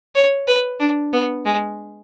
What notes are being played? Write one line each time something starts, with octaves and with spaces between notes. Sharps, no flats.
C#5
B4
D4
B3
G#3